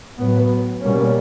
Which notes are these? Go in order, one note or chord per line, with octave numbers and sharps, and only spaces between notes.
A2 F#3 B3
B2 G3 A#3 C#4